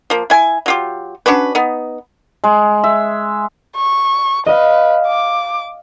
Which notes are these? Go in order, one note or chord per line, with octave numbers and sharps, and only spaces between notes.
F3 A#3
E4 G#5
F#3 F4 G4
C#4 D4 F#4 B4
B3 D#4
G#3
E5
C#6
B4 D#5 F5
D6